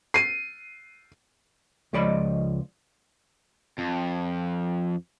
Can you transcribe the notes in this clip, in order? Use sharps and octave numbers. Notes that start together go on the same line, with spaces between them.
C7 D#7
C#2 F3 G#3 D5 D#5 B5
F2